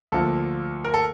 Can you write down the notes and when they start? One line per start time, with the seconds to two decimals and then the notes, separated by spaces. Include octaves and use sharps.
0.12 D2 D3 F3 A#3 A4
0.85 A#4
0.94 A4